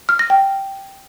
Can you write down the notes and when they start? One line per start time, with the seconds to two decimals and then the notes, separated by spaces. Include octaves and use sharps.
0.09 F6
0.19 A#6
0.30 G5